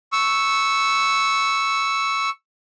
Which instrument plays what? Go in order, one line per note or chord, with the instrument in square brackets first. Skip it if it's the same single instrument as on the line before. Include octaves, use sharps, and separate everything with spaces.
[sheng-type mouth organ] C#6 E6